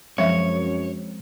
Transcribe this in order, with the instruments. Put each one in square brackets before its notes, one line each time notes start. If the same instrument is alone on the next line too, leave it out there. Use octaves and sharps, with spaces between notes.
[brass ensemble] F#2 [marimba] F3 E5 [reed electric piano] G#3 C4 [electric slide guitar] C#5